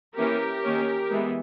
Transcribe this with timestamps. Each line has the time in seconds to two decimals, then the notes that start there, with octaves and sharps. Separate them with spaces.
0.16 E3 A#3 C#4 G4 A#4
0.64 D#3 A#3 C#4
1.11 E3 G#3 B3